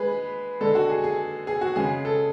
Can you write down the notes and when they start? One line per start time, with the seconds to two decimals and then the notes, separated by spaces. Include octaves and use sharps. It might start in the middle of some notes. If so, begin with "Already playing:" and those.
Already playing: G#3 G#4 B4
0.60 D3 G#3 A4
0.75 F#4
0.90 G#4
1.04 G#4
1.47 G#4
1.61 F#4
1.76 C#3 G#3 G#4
2.05 A4